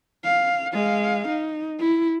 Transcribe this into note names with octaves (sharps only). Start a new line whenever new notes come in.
F5
G#3 F5
D#4
E4